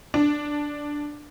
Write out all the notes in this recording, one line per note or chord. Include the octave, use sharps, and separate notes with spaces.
D4